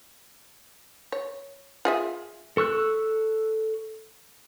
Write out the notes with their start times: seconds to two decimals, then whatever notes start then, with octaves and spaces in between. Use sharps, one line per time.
1.12 C#5
1.85 F4 G#4 E5
2.57 A4 C#6 E6 F#6